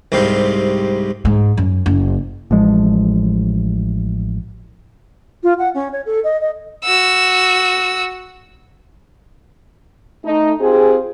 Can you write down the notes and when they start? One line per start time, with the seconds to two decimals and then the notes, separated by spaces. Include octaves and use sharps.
0.12 C2 G#2 C3 G3 F5
1.25 G#2
1.57 F#2
1.86 F#1
2.51 A1 F3 G#3
5.43 F4
5.58 F#5
5.74 C#4
5.92 C#5
6.05 A4
6.23 D#5
6.40 D#5
6.84 F#4 E6
10.24 A3 D#4
10.61 C4 F4 G4 G#4